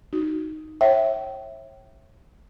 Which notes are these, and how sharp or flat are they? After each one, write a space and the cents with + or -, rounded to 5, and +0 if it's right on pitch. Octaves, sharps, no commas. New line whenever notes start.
D#4 +0 F#4 +0
C#5 -35 E5 +0 G5 -30